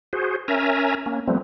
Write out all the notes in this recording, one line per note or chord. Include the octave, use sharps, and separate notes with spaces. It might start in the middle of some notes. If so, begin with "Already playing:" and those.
F#4 G#4 C5
C#4 A#4 E5 G#5 A#5
A#3 C#4
F3 G3 A3 B3 C4